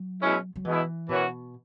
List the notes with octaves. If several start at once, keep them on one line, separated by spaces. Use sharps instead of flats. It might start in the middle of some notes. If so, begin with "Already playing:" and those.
Already playing: F#3
B2 G#3 C#4 E4
F#3
B2 E3 G#3 E4
F#2 B2 E3 C#4 F#4